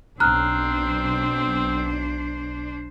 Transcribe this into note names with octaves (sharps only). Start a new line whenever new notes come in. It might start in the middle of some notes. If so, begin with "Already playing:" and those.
B1 C4 D4 C5 A#5 F6 F#6